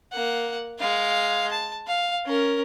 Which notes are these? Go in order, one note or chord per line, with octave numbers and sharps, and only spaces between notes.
A#3 F#5
G#3 F5
A5
F5
C#4 A#4